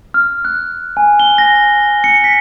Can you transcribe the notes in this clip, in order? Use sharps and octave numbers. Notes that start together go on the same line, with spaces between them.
F6
F#6
G#5
G7
A#6
C#7
B6